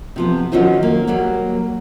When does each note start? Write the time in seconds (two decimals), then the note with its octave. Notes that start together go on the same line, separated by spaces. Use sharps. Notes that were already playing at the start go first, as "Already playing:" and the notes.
0.16 C3 F3 B3
0.52 D#3 F#3 C#4 F4 C5 E5
0.83 A#3
1.08 F#3 G3 A#3